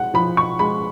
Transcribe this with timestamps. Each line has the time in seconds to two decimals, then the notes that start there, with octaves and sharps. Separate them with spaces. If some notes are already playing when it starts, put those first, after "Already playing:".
Already playing: G#3 F#5
0.14 F3 B5
0.37 C#6
0.59 G#3 B5